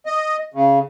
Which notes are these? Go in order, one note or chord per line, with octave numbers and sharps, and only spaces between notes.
D#5
C#3